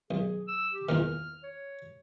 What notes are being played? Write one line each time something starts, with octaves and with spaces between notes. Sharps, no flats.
B1 G#4
E6
G4
E2 A#2 D#3 F6
C#5